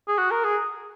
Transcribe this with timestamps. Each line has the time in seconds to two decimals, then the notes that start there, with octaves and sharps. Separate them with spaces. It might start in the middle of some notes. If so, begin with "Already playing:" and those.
0.08 G#4
0.18 F#4
0.31 A#4
0.44 G#4